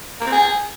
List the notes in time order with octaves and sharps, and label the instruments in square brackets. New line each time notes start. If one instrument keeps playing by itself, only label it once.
[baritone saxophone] A#3
C4
G#4